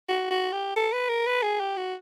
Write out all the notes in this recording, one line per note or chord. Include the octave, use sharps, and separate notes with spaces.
F#4
F#4
G4
A4
B4
A#4
B4
G#4
G4
F#4